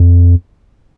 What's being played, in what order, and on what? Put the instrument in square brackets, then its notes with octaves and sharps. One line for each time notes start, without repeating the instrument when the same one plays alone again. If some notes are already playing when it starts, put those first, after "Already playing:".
Already playing: [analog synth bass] F2